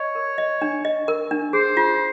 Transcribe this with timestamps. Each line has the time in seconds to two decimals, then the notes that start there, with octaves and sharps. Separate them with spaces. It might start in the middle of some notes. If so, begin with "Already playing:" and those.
Already playing: C#5 D#5
0.15 A#4
0.38 D#5
0.62 D4
0.85 D#5
1.08 A#4
1.31 D4
1.53 G#4 C5
1.77 F4